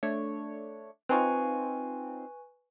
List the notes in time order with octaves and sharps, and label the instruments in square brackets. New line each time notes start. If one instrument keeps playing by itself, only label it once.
[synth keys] A3 D4 C#5
[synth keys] C4 D#4 F4 [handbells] B4 G#5 C#6